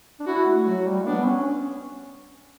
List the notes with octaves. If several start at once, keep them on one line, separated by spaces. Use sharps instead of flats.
D4
E4 F#4
A3
F#3 F#4
G3
B3 D4
C#4